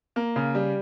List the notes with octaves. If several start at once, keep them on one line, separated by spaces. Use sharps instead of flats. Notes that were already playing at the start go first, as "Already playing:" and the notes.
A#3
C#3
G3